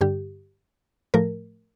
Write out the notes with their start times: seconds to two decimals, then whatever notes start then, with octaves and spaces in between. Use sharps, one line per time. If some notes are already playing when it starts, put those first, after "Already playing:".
0.01 G2 D3 G3 G4
1.14 A2 F3 A3 A#4